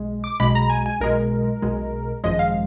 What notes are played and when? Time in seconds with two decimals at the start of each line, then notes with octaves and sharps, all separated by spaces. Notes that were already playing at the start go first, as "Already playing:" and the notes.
Already playing: B1 G#3
0.24 D6
0.40 B1 B2 G#3 B5
0.55 A#5
0.70 G#5
0.86 G#5
1.00 B1 B2 G#3 A#4
1.62 B1 B2 G#3
2.24 G#1 F#2 F3 G#3 D#5
2.39 F5